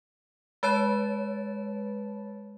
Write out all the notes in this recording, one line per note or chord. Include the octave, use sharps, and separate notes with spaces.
G#3 B4 C#5 A5 A6